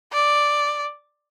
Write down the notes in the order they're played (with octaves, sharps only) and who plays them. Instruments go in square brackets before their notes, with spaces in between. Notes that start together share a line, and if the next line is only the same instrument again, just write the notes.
[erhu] D5